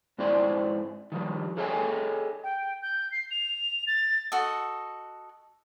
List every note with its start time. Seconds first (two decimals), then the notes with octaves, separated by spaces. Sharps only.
0.18 G#2 C4 E4 C5 D5 G5
1.12 D#3 F3 G3
1.57 G#4 A4 C#5 D#5 G5 G#5
2.43 G5
2.82 G6
3.12 C7
3.31 F7
3.87 A6
4.32 F#4 A4 D#5